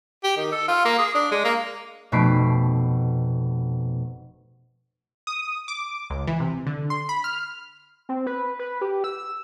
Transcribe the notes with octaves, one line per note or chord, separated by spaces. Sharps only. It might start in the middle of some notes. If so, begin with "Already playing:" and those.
G4
D#3
A4
F4
A#3
G#4
D4
G#3
A#3
F1 B2 A3 B5 C7 D7
D#6
D6
C#2
E3
C3
D3
C6
B5
F6
C4
B4
B4
G4
E6